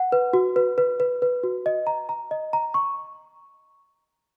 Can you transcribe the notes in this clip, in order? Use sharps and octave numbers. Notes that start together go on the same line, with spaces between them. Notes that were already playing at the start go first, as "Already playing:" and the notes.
Already playing: F#5
B4
F#4
B4
B4
B4
B4
F#4
D#5
A#5
A#5
D#5
A#5
C#6